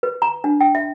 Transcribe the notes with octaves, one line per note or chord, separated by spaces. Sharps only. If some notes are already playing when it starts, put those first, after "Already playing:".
B4
A#5
D4
G5
E5